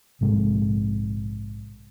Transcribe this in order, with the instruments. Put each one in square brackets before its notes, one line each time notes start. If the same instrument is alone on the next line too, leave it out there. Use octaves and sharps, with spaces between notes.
[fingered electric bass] A#1 G#2 C3 G#3